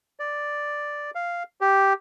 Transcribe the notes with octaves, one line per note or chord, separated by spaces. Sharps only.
D5
F5
G4